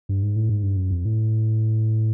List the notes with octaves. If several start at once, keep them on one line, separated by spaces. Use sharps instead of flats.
G2
G#2
A2
G#2
G2
F#2
F2
A2